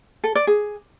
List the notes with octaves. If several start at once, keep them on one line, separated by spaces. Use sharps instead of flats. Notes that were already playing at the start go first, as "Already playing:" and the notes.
A4
D5
G#4